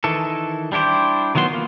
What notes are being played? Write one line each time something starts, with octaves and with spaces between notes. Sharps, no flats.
D#3 E3 A4
G3 D4 E4 G4 C5
D#3 E3 F#3 B3 C6
A#3 B3 F4